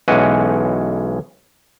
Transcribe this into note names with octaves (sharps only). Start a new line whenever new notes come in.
B1 E3 G#3 C#4 F#5 G#5